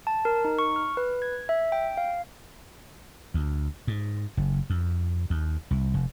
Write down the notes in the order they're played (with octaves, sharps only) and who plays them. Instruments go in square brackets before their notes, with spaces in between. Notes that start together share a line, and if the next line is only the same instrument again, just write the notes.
[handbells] A5
A#4
D#4
C#6
F6
B4
G#6
E5
G5
F5
[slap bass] D2
G#2
F#1
F2
D#2
C2
F1